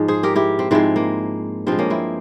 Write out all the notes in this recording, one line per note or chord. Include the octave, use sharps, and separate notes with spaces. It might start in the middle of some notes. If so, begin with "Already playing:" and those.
Already playing: G#2 F3 G#3
G#4 C5
G4 A#4
E4 G4
C4
G#2 F3 G#3 C4 E4
A#3
G2 F3 G#3 C4
A#3 C#4
C4 E4